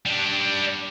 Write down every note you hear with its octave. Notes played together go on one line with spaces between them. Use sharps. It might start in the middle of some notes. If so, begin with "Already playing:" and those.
G3 D4